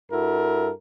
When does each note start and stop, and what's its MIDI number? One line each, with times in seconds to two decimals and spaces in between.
0.10 0.70 43
0.10 0.70 64
0.10 0.70 66
0.10 0.70 69
0.10 0.70 70